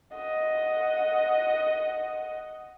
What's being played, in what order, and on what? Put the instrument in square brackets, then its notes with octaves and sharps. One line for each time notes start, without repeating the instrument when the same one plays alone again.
[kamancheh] D#5 F#5